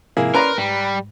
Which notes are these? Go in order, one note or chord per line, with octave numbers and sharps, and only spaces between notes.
G#2 C3 F3 A#3 E4 G#4
C#4 A#4 B4 D5 A#5 C6
G#2 G3